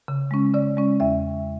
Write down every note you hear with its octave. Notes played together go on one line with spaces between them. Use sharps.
C#3
G#3 C#4
C#3 D5
G#3 C#4
E2 E5